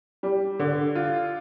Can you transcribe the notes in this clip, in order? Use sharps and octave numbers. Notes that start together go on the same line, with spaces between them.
G3
D3
F4